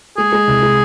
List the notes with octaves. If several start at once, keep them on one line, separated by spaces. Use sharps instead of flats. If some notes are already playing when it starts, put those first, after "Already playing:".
G#3 G#4
G#3
C2
G#3